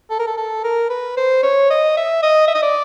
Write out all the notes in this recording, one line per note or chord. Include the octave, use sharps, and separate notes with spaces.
A4
A#4
A4
A4
A#4
B4
C5
C#5
D#5
E5
D#5
E5
D#5
D5